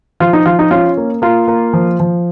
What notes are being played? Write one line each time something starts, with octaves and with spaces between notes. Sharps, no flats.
F3 F4
D#4
F3 F4
D#4
C#4 F4
A#3
A#3 F4
A#3
F3
F3